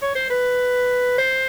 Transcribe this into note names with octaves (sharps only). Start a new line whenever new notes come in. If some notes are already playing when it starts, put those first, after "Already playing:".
C#5
C5
B4
C5